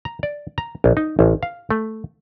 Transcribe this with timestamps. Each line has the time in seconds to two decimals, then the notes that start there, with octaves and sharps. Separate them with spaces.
0.05 A#5
0.23 D5
0.58 A#5
0.84 A#1
0.97 D#4
1.19 A1
1.43 F5
1.71 A3